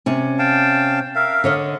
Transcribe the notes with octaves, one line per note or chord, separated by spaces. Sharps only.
C3 C#4 D5
F5 G5 A5
A#4 E5 F5
D3 C#5 D#5